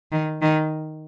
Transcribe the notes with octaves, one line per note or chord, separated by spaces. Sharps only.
D#3
D#3